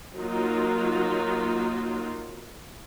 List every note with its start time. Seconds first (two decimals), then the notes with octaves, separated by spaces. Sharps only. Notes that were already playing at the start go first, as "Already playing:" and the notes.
0.17 F#3 A#3 D#4 F4